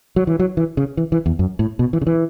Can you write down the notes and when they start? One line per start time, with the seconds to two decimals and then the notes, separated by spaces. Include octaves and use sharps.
0.16 F#3
0.27 E3
0.39 F#3
0.57 E3
0.77 C#3
0.97 E3
1.12 E3
1.26 E2
1.39 F#2
1.59 A2
1.79 B2
1.93 E3
2.01 C#3
2.07 E3